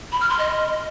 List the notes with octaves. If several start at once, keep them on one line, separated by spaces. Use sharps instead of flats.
B5
F6
C6
D#5